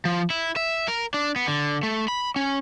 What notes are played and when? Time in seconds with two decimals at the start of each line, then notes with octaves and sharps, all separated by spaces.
0.05 F3
0.30 E4
0.56 E5
0.88 A#4
1.14 D4
1.36 B3
1.48 D3
1.83 A3
2.08 B5
2.36 C#4